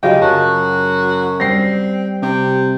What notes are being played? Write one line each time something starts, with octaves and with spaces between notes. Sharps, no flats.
C#3 F#3 F4 G4 D#5 F5
F#2 C#3 F#4 A5
G3 C4 A#6 C7
C3 G4 D6